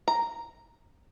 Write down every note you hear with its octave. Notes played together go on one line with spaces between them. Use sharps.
A#5